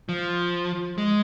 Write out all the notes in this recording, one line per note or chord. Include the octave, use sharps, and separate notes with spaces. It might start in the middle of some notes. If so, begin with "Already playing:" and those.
F3
G#3